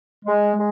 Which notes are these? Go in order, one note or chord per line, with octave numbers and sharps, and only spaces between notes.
G#3
G#3